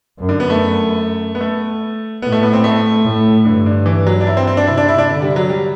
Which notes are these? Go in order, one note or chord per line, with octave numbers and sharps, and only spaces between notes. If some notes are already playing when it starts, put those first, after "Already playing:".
F#2
D3
B3
A3
F#2
B3
A3
A2 B3
A3
B3
C4
A3
A2
G2 D3
D3
E3
F#3
D4
E4
C4
C4
D4
C3 E4
D4
E4
D4
D3
G3
F#3
G3